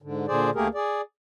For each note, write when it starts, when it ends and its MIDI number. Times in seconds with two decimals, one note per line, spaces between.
0.02 0.26 44
0.02 0.26 50
0.28 0.50 46
0.28 0.50 50
0.28 0.50 68
0.28 0.50 72
0.28 0.50 74
0.55 0.68 38
0.55 0.68 57
0.55 0.68 58
0.55 0.68 67
0.55 0.68 68
0.55 0.68 70
0.74 1.01 68
0.74 1.01 74